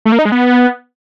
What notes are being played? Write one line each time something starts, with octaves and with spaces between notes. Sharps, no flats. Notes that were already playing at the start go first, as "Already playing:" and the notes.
A3
A#3
D#4
G#3
B3